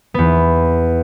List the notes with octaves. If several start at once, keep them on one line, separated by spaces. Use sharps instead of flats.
E2 B3